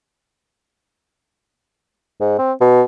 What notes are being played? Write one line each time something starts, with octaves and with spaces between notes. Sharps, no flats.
G#2
C4
B2